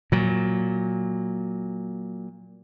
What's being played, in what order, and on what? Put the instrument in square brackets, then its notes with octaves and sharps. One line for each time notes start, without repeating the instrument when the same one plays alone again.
[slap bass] A#2 F#3